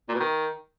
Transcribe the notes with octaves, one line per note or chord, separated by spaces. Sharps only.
A#2
B2
D#3